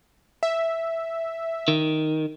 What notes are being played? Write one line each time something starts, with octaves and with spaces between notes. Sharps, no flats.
E5
D#3